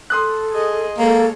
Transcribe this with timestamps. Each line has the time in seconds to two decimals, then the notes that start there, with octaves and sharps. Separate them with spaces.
0.10 A4 C6 D#6 F#6
0.51 G#4 D#5
0.99 G#3 A#3 A4 C#5